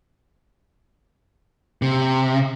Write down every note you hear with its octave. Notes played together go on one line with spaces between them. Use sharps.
C3